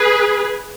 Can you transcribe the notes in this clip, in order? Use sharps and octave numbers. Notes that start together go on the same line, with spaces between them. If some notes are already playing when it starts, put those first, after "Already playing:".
Already playing: G#4 B4